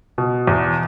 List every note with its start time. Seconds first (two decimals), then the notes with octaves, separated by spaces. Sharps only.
0.18 B2
0.47 E2